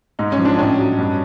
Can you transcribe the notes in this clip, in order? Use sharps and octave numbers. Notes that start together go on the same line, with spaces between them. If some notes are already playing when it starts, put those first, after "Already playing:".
G#2 D#4
C#4
F3
D4
A2 C#4
F#3
G2